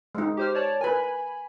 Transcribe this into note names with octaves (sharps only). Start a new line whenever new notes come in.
G#3 D#4
G4 C5 F6
C#5 D5 A5
A#4 B4 G#5 B5